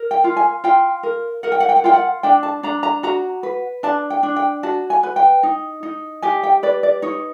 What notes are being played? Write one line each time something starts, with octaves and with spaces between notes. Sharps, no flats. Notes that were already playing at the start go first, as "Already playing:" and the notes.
Already playing: A#4
G5
F4
G#5
F4 G5
A#4
A#4 F#5
G5
F#5
G5
F#5
F4 G5
F#5
D4 G5
A5
D4 A#5
A#5
F#4 A#5
B4
D4 A5
G5
D4
G5
F#4 A5
G#5
B4
G5
D#4
D#4
G4 G#5
G5
B4 D5
D5
D#4 C#5